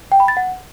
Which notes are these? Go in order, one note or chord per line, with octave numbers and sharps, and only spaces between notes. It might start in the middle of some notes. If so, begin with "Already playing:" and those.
G5
B5
A6
F#5